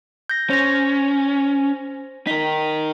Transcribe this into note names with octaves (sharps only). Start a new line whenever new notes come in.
G6 A#6
C#4 C5 A#6
D#4 A#4 B6